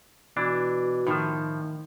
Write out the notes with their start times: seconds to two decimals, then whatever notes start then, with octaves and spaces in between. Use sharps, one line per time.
0.37 B2 E3 D4
1.07 A2 D#3 F3